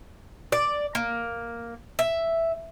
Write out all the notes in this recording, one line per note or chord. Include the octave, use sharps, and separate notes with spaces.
D5
A#3
E5